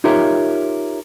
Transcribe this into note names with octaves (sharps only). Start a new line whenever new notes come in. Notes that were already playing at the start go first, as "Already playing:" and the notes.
D#4 F4 G4 A#4 C#5 E5